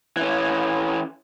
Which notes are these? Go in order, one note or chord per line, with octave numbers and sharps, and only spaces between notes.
E3 C#4